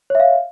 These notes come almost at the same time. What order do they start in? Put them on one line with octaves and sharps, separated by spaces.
C#5 E5 F5